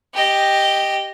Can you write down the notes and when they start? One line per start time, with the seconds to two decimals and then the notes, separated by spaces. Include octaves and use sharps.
0.14 G4 D#5